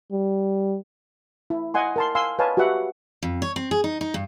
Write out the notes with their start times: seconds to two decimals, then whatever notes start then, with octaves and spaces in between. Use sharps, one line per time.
0.12 G3
1.50 E4
1.74 D#5 F#5 G#5 C6
1.96 A#4 A5 C6
2.15 F5 G#5 C6 E6
2.39 B4 C#5 D#5 F5 G#5 A5
2.57 F#4 G4 B4 E5 F#5
3.23 F2
3.42 C#5
3.56 C4
3.71 G#4
3.84 D#4
4.01 D#4
4.14 G2